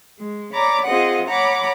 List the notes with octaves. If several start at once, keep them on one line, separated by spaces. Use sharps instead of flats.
G#3
C#5 D5 A#5 B5 D6
C4 F4 G#4 D#5 F#5
C#5 F#5 A#5 B5 D6